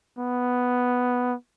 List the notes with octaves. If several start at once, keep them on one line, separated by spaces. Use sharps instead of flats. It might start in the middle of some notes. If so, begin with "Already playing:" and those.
B3